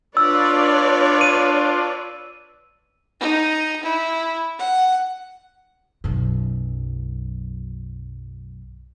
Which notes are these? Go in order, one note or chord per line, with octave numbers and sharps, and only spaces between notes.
D4 F4 B4 C#5 D5 E6
D#7
D#4
E4
F#5
B1 F#2